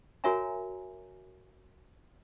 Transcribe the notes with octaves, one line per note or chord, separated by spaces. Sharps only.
F#4 A#4 C#5 E5 G#5 A#5